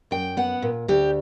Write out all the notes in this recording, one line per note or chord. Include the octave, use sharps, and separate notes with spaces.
F#2 G5
B3 F#5
A#2
D2 G4